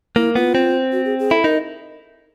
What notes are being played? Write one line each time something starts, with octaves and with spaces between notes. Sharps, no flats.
A#3 E4
B3 F4
C4
F#4
G#4
G#4
E4 A4
D#4 A#4